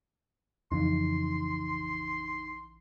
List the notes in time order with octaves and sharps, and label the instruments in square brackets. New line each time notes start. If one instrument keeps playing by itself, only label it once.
[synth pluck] A#1 C#3 E3 [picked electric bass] F2 [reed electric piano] D#4 [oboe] C6